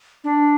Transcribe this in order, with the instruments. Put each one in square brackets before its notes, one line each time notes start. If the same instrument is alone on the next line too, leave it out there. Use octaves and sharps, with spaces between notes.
[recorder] D4